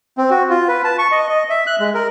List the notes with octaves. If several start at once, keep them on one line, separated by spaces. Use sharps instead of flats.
C4
F#4
F4
B4
A5
C#6
D#5
D#5
E5
F#6
G#3
A#4